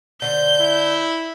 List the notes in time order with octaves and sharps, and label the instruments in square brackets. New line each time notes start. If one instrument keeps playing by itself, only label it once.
[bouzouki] D3 C5 [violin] G6
[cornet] E4